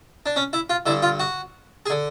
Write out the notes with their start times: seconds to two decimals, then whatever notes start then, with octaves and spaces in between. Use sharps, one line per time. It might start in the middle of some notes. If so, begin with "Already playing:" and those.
0.26 D4
0.36 C#4
0.53 E4
0.70 F4
0.86 G2 D3 E4
1.02 F4
1.20 F#4
1.86 G#4
1.90 D3